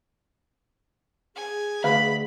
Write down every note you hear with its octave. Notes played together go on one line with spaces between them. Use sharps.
G#4 G#5
D2 B4 F5 B5